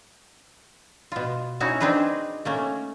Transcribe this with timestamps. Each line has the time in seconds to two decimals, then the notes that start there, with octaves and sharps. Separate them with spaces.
1.12 B2 F4
1.60 C#4 D#4 E4 F#4 C#5
1.80 C4 D4 D#4 G#4 B4
2.45 A3 A#3 C#4